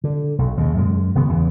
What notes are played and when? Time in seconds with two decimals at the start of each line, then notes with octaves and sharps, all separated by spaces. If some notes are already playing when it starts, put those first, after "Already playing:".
0.04 D3
0.38 B1
0.57 D#2 C#3
0.77 F#2 F#3 G#3
1.15 G#1 C#3 B3
1.29 E2 C#3 E3